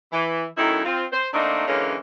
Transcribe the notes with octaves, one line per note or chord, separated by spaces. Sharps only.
E3
F#2 D#3 A3 D#4 E4
C4 F4
C5
D#3 A3 A#3 C4 D4 D#4
D3 E3 G#3 A#3 C#4